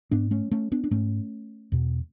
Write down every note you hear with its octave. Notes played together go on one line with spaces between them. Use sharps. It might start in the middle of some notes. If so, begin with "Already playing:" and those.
G#2 B3 D4
A3 C#4
A3 C#4
B3 D4
D4
G#2 A3 C#4
E2 B2